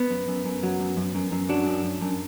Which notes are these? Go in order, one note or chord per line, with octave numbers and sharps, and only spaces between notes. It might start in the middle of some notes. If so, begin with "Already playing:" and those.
Already playing: B3
F#2
F#2
F#2
F#3
F#2
F#2
F#2
F#2
F#3 D4
F#2
F#2
F#2